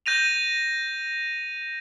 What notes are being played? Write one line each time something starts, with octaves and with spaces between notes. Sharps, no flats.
G6 A#6 D#7 F7